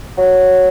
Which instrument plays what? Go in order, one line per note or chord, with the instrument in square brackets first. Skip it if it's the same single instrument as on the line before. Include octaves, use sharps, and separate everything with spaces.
[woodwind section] F#3